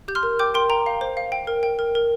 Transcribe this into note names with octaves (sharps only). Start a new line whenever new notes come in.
G4 G6
C6 F6
A#4
G5 D6 G6
A#4 G5 C6
G5 A#5
F5
C5
F5
G5
A#4
G5
A#4
A#4